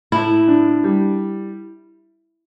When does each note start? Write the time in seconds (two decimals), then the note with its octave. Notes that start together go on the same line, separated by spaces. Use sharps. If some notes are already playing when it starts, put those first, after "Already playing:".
0.12 A2 E4
0.48 D4
0.84 G3